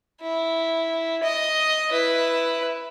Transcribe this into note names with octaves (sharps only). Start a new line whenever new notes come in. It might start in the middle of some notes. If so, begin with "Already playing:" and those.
E4
D#5
E4 B4